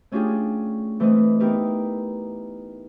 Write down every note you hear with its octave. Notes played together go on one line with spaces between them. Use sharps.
A3 C#4 D4 F4 G4 G#4
E3 A3 C4 B4 D#5
B3 D#4 E4 G4 A#4 B4